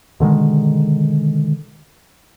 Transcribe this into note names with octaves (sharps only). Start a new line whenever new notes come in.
B2 D3 D#3 G#3